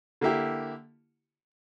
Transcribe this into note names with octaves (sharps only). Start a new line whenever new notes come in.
D3 A#3 E4 G4